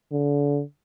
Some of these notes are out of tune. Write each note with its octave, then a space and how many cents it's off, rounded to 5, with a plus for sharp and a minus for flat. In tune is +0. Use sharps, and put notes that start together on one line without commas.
D3 -35